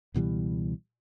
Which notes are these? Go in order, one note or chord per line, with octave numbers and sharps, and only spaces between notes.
C#2 B2 E3 G3